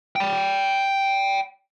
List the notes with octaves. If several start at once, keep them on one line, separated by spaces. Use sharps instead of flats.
G5 B5